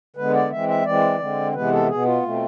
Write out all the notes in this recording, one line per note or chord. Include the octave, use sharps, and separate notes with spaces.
D3 G#3 B3 B4
D5
E3 G#3 C4 E5
E5
E3 G#3 C4 D5
D3 G#3 C4
C3 E3 G#3 B3 B4
A4
B2 B3 G#4
F4
B2 A3 C4